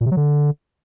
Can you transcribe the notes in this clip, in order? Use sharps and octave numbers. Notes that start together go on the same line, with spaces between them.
A#2
C3
F#3
D3